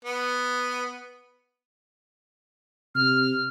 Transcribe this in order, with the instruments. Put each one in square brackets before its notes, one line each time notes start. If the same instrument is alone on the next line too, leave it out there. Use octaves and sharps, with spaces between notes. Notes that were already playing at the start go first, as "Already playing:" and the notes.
[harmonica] B3
[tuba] C3 [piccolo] F6